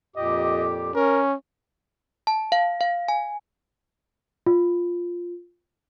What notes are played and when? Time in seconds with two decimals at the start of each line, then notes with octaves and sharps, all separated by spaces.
0.16 F2 A#2 G4 D#5
0.95 C#4 A#4
2.27 A5
2.52 F5
2.81 F5
3.08 G#5
4.46 F4